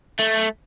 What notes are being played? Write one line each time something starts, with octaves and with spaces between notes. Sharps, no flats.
A3